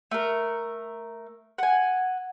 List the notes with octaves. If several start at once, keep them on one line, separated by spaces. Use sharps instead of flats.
A3 A#4
F#5 G#5